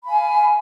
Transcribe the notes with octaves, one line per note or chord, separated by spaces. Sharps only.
F5 G#5 B5